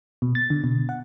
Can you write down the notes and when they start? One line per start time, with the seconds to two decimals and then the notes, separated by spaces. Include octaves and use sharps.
0.22 B2
0.35 A6
0.50 D3
0.64 B2
0.89 F#5